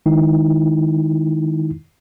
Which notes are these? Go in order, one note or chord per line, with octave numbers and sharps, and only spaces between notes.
D#3 G#3 D#4 E4